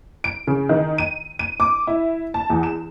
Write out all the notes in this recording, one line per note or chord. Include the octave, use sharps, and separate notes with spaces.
D7
C#3
D#3
D#7
D#7
D6
E4
A5
E2
E7